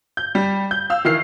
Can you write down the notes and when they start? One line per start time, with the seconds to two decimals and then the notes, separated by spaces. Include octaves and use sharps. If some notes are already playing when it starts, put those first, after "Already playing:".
0.17 G6
0.35 G3
0.71 G6
0.90 F5 E6
1.05 D#3 E3 F6 C7